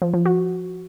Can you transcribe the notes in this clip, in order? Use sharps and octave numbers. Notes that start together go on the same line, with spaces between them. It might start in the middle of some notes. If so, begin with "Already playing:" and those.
F3
F3
F#4